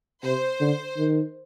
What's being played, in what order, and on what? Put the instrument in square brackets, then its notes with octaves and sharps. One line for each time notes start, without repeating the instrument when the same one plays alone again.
[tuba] C3 [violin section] C5
[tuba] D3
D#3